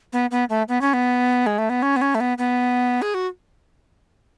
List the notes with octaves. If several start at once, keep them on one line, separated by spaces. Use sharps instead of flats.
B3
B3
A3
B3
C#4
B3
G#3
A3
B3
C#4
B3
C#4
A3
B3
B3
G#4
F#4